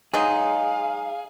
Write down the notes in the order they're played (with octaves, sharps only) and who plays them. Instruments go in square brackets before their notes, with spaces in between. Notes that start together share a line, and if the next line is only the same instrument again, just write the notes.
[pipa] F#3 G#3 D#4 [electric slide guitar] G#4 [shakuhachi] F5